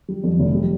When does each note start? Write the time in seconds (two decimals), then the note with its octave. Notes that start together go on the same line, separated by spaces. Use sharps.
0.08 G3
0.24 F2
0.39 F1
0.54 G3